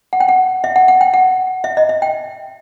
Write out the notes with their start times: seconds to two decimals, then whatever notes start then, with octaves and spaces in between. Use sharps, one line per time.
0.13 F#5
0.20 G5
0.29 F#5
0.64 E5
0.76 F#5
0.88 F#5
1.01 G5
1.14 F#5
1.64 E5
1.77 D#5
1.89 E5
2.02 G5